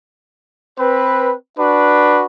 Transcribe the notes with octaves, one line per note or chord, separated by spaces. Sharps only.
C4 B4
D4 F#4 B4